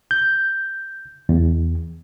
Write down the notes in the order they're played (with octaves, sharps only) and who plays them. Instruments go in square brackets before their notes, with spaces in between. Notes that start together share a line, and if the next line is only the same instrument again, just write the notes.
[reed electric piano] G6
E2